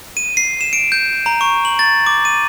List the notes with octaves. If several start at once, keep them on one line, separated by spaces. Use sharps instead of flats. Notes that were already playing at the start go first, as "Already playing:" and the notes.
D#7
C7
E7
D7
G6
A#5
C#6
F#7
A6
D6
D#7